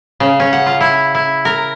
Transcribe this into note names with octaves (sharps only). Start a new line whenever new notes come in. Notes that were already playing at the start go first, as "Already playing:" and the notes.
C#3
C#4
F#5
F4
E4
E4
A#4